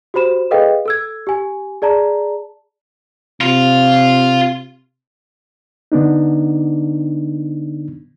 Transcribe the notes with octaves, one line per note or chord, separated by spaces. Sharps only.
F#4 G4 C5 B5 E7
G#4 A4 B4 D#5 F5 G5
A4 E6 G#6
G4 G#5
G#4 D5 A5 A#5
C3 F4
D3 B3 D4 D#4